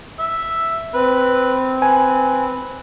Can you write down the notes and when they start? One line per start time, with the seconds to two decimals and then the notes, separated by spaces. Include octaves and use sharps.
0.19 E5
0.94 C4 B4
1.82 B4 G#5